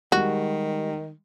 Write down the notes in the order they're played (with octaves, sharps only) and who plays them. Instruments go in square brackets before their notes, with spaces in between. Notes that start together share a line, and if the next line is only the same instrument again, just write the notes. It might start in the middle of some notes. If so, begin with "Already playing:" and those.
[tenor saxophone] D#3 [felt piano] G3 G#3 [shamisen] F#4